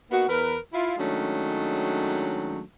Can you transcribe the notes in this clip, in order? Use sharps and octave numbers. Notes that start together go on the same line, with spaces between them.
A#3 B3 D#4 F#4
E2 A#4 B4
E4 F4
D#3 F#3 G#3 A3 C#4 D4